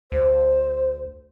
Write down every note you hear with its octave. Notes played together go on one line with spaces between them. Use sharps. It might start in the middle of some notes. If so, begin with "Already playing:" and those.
D2 C5